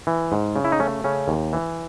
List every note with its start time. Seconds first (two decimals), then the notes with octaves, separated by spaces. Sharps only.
0.07 E3
0.32 G#2
0.56 C#3
0.64 E4
0.72 D#4
0.80 A3 C#4
1.04 C#3 C#4
1.28 D#2
1.53 E3